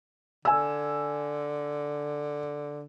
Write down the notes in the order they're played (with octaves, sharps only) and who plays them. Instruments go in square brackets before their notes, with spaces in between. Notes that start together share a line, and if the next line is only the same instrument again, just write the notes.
[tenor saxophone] D3 [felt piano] G#5 E6